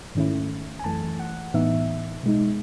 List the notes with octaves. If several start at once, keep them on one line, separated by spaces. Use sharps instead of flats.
G#2 D#3 A3 C#4 E4
G#5
F#2 E3 A3 A5
F#5
A2 E3 B3 D#4 E5
B2 G#3 D#4